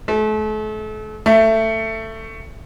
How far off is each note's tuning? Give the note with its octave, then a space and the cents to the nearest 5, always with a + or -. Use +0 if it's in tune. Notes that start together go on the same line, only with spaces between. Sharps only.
A3 -40
A3 +15